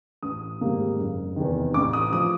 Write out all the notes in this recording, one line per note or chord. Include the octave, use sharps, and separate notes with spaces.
A1 D#6
G#2 D#3 G3 A#3
F#1
E2 C3 D#3
A1 D6
D#6
F3 D#6